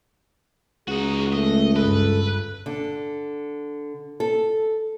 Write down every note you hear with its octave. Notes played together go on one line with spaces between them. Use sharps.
C#2 D#4 F#4 G#4
A3 D#5
G1 A4 B4
D3
A4